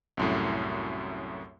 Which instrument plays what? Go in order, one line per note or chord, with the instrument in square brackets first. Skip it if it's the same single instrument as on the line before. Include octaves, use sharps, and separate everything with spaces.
[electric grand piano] C2 F#2 A2